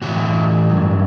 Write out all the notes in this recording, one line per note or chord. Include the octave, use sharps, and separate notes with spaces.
A2 E3 F#4
G2 F#3